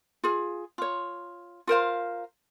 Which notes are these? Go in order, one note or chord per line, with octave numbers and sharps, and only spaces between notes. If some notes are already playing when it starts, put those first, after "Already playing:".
F4 G#4
F4 C#5
F4 A#4 C5 F5